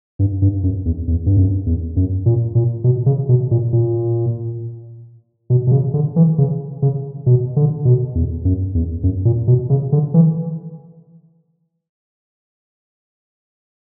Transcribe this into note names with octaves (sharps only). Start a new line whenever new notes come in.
G2
G2
F#2
E2
E2
G2
F#2
E2
F#2
A#2
A#2
B2
C#3
B2
A#2
A#2
B2
B2
C#3
D3
E3
C#3
C#3
B2
D3
B2
E2
F#2
E2
F#2
A#2
B2
C#3
D3
E3